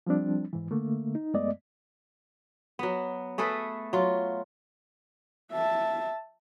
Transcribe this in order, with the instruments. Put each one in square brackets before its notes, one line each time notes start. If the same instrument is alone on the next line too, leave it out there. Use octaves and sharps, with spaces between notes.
[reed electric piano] F3 G3 C4 D4
G#2 E3
D3 A3 A#3
D#4
F#2 G#3 A3 B3 D5 D#5
[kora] F#3 B3
A3 G#4 A4 B4
F#3 F4
[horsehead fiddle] E5 A5